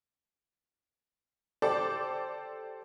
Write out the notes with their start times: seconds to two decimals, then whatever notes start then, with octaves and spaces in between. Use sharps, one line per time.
1.62 G4 A4 C5 D5 D6